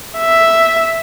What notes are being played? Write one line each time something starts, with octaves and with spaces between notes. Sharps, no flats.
E5